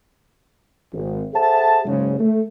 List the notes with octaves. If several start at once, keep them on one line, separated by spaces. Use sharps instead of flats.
G#1
G#4 A4 C5 E5 F#5 A5
F#1 G#2 C#3 G#3 G#4
A3